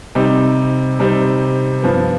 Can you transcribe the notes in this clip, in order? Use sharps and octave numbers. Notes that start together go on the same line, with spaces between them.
C3 G3 C4 D#4
C3 G3 C4 D#4
G2 F3 B3